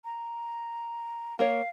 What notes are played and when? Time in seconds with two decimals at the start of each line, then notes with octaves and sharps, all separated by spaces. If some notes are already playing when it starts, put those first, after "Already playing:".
0.04 A#5
1.39 A#3 A#4 C#5 F5